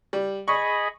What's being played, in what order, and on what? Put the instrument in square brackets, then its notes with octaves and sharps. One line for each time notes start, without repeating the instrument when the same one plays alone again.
[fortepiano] G3
[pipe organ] G#4 D#5 B5 [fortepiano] C#6